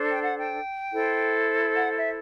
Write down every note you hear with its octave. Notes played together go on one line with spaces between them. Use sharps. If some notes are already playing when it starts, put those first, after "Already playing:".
Already playing: D4 A4 C5
G5
F#5
G5
E4 A4 C5
F#5
E5